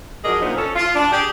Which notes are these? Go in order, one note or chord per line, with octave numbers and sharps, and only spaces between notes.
F3 F#3 D4 G#4 A#4 D#5
F#2 A#2 B3 D4 D#4 C5
C#4 A4
F4
D4
G4 G#4